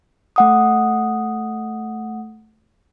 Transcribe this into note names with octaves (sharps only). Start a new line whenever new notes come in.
A3 F#5 D#6